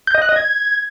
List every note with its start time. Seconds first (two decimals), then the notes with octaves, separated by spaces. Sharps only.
0.07 G6
0.15 D#5
0.22 F#6
0.29 D#5
0.36 G#6